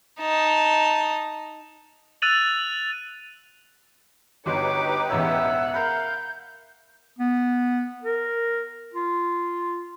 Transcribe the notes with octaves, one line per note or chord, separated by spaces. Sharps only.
D#4 A5
E6 F#6 A6 D#7 F7 F#7
G1 D#4 F#4 G4 B4 C#5 C6 D6
E1 A1 C#5 E5 F#5 E6
A#4 F5 A#5 B5 G6
B3
A#4
F4